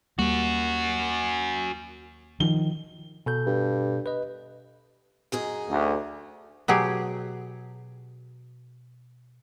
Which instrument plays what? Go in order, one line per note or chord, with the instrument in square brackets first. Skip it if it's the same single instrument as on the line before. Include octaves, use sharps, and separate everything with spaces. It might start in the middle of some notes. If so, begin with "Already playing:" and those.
[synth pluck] D#2 A#3 [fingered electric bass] G3 [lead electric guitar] C#4 F#4
[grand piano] D#3 G7 [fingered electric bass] F3
[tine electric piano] B2 A4 G6
[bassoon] G2
[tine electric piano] B4 D#5
[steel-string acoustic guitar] F#2 D#4 G#4
[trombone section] D2
[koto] B2 F#3 G4 G#4